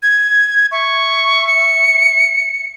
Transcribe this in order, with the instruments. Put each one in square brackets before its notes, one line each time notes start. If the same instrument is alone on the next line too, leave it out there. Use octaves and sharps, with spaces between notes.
[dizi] G#6
[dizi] E5 [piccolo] C#6
[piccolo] C#7